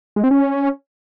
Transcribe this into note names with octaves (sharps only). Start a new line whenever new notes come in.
G#3
C4
C#4